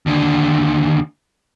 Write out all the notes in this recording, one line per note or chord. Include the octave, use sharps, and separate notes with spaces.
D#2 D3